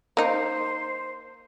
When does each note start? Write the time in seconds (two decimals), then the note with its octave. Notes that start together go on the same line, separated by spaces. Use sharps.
0.17 A#3 D#4 C5